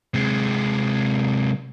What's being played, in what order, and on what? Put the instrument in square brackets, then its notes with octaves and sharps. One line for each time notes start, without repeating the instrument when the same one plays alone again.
[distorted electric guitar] C3 G#3